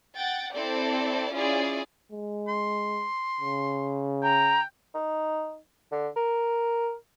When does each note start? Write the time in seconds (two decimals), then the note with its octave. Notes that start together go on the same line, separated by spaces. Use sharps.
0.16 F#5 G5 A6
0.54 C4 E4 A4 D5
1.32 C#4 E4 F4 G#4 D5
2.12 G#3
2.48 C6
3.41 C#3
4.23 G5 A#5
4.94 D#4
5.92 D3
6.16 A#4